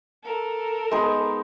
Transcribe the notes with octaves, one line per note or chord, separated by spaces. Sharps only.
A4 A#4
G#3 B3 D#4